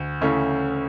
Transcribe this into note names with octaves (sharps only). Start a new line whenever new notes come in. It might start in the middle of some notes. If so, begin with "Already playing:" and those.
Already playing: D2
C#3 E3 A3 C#4